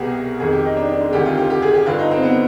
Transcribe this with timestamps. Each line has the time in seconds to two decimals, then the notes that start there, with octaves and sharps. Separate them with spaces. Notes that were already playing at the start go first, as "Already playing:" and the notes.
Already playing: C2 B2 G4 G#4
0.40 F2 D#3 G#4
0.52 G4
0.65 D#4
0.77 D4
0.89 D4
1.01 G#3
1.13 D2 C3 D#3 G4
1.26 F4
1.38 G4
1.50 G4
1.62 G#4
1.74 G4
1.86 G2 D3 F4
1.99 D#4
2.11 C4
2.23 B3